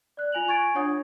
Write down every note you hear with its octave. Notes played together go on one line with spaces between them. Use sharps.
D5 F#6
F4 G#5 F7 F#7
G#5 C#6 G#6 A6 D7
D4 F4 C#5 F#5 D#6 G#6